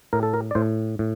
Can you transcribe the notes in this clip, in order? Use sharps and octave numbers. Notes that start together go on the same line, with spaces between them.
A2 A#4
A4
A#4
D5
A2 C5
A2